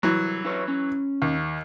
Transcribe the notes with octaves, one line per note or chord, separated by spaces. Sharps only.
C2 E3 F#3
E4 B4 C#5
C#4
D#2